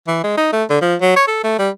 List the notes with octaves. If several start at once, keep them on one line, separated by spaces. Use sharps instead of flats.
E3
G#3
D#4
A3
D3
F3
F#3
C#5
A4
A3
G3